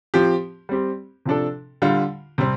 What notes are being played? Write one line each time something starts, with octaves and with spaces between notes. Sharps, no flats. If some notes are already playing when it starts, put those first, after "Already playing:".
F3 C4 G4
G3 C4 G4
C3 F3 D4 A4
D3 G3 F4
C3 G3 C4